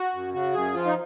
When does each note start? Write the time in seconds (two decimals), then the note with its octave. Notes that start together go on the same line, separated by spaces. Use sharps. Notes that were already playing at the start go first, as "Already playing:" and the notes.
Already playing: F#4
0.14 F#2
0.34 C#3 F#4
0.54 F#2 G#4
0.74 F3 F4
0.86 D#4